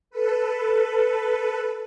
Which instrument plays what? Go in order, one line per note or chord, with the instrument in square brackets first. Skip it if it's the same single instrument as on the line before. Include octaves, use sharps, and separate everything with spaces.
[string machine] A4 B4